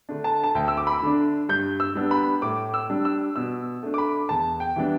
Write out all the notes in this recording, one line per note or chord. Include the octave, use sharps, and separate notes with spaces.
D3 A3 D4
A5
A5
D2 G5
E6
D6
B5
D3 A3 D4
G2 G6
E6
G3 B3 D4
B5
A2 D6
E6
G3 D4
E6
B2 E6
A3 D4
D6
B5
E2 A5
G5
E3 G3 B3 D4